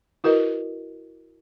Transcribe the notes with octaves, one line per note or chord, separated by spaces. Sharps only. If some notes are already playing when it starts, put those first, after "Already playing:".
E4 F#4 A#4 B4 D#5